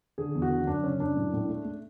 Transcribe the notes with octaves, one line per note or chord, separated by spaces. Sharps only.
D3 G#4
E2
F#4
D3
F#2 D4
C#3 C#4
F#2 D4
A2
A2
A3
A3